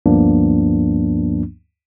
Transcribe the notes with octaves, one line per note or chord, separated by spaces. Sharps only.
D2 G2 F3 A#3 B3 D4